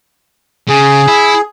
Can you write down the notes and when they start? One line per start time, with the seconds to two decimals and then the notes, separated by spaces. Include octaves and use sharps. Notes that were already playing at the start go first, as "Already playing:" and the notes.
0.69 C#3 G#4
1.07 E4